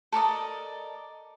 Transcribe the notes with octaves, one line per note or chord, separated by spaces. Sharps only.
A4 A#4 D5 D#5